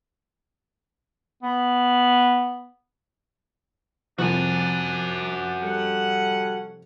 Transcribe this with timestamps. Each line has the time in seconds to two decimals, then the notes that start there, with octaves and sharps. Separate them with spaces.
1.43 B3
4.18 C2 F2 F3 D4 F#4 D5 G#5
5.62 G3 C#4 A4 F#5